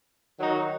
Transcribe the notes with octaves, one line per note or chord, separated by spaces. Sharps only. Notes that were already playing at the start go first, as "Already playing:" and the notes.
D#3 F#3 D#4 F#4 A#4